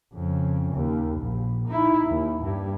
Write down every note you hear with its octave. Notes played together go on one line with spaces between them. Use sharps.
F2 C#3
D#2
A#1
D#4 E4
D#2
G2